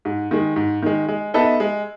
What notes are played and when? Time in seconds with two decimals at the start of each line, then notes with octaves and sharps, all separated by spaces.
0.05 G#2
0.31 D#3 G#3
0.56 G#2
0.82 D#3 G#3
1.08 G#3
1.34 B3 D#4 A4 E5
1.60 G#3